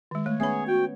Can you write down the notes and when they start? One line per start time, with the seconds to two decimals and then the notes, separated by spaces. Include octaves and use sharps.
0.11 D#3 G#3
0.26 A3 C#5
0.40 B3 C#4 G#4 C#5 E5 B5
0.68 F#4 G5